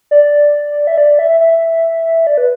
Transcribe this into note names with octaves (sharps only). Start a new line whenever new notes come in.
D5
E5
D5
E5
E5
D5
B4